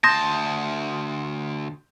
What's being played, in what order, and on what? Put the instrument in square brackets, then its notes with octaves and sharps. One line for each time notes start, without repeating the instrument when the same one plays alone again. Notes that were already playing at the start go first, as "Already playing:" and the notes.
[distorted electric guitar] D2 A5 [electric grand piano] C6 D#6 G6 [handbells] A#6